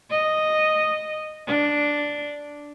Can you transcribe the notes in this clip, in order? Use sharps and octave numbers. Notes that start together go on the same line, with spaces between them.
D#5
D4